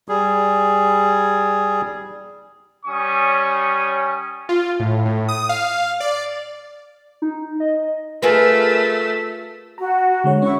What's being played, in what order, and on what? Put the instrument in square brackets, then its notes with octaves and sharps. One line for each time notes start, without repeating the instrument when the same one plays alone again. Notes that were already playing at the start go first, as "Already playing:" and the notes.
[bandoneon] G3 G#4
[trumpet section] G3 C#4 C#5 G#5 C#6 D#6
[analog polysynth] F4
A2
A2
D#6
F5
D5
[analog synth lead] D#4
D#5
[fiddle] A3 [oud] F4 G#4 B4 [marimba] A#4 [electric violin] E6 B6
[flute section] F#4 [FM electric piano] A#5
[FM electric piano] D3 G#3 C#5
[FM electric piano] C#4 C#5 [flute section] E4 C#6